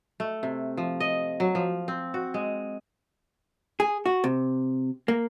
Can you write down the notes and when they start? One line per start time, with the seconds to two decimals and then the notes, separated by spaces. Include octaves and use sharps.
0.20 A3
0.43 C3
0.77 F3
1.00 D#5
1.40 F#3
1.55 F3
1.88 C4
2.14 F#4
2.34 G#3
3.80 G#4
4.06 F#4
4.24 C3
5.08 A#3